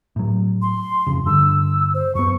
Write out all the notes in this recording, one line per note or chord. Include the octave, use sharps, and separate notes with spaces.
A2 F#3
C6
F#1 F2 C#3
G2 D3 E6
C5
F#2 B3 C#6